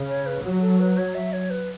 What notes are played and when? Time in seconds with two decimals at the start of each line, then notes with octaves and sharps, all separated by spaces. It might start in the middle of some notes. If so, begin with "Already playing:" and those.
Already playing: C#3
0.08 C#5
0.26 B4
0.44 F#3 F#4
0.62 A4
0.79 B4
0.97 C#5
1.15 E5
1.33 C#5
1.50 B4